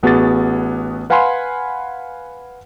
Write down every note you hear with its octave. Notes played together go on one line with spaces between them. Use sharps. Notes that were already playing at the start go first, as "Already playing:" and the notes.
A1 B3 F#4 G#4 D6 A6
B4 F5 F#5 G#5 B5 C6